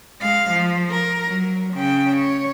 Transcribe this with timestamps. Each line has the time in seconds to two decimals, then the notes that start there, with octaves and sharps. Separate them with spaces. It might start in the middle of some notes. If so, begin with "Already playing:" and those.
0.20 G#3 F5
0.50 F3
0.90 A#4
1.28 F#3
1.74 C#3 G5
2.16 C#5